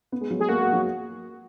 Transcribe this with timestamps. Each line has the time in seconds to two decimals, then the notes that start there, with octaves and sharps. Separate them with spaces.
0.12 B3
0.21 G#3
0.30 F#3
0.39 G#3 G#4
0.49 A#3 F#4
0.61 G#3
0.73 F#3